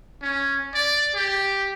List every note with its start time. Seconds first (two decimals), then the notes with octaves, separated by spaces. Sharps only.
0.22 C#4
0.74 D5
1.15 G4